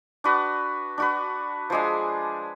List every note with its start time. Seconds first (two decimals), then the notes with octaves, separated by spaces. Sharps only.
0.24 D4 F#4 B4
0.98 D4 F#4 B4
1.70 F3 G#3 D4 G#4